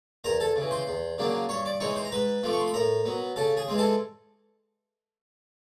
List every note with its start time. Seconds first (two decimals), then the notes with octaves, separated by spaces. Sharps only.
0.24 E2 A#4 A#5
0.40 A4 A5
0.56 C#3 E3
0.71 C5 C6
0.87 E2
1.18 C#3 F#3 A#3 D4
1.49 G2 C#5 C#6
1.65 D5 D6
1.80 E3 G#3 C4 D#4 C#5 C#6
1.96 C5 C6
2.05 A#5
2.12 G#2 B4 B5
2.43 F3 A3 C4 D6
2.53 C#6
2.60 C6
2.68 B5
2.74 A2 A#4 A#5
3.06 F#3 B3
3.36 C#3 A4 A5
3.57 G#4 G#5
3.68 E3 G#3 C4
3.78 A4 A5